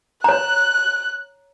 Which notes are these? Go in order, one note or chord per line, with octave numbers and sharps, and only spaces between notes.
C#5 A#5 F#6